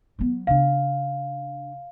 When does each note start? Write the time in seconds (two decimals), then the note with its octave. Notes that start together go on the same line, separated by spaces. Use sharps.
0.19 F#3 B3
0.47 C#3 D4 F5